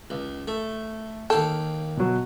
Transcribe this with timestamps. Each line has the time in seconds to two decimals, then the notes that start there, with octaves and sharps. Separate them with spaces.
0.10 C#2
0.48 A3
1.30 D#2 A4 F5 G5
1.97 B2 F#3